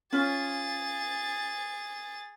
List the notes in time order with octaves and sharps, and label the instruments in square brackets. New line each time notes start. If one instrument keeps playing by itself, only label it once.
[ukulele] C#4 F4 [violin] G#4 A6